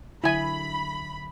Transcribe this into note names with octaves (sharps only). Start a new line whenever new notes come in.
D3 F#3 E4 E5 G#5 B5